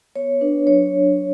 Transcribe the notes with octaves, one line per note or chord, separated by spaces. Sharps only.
B3 C#5
D4 B4
F#3 C#5